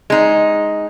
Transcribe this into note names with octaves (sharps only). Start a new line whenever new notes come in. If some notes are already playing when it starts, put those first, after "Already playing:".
G#3 D#4